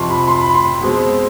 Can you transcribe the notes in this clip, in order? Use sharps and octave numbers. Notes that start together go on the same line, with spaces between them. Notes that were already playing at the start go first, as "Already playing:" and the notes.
Already playing: F2 C3 F3 C6 C#6
B5
C6
B5
C6
B2 G#3 C4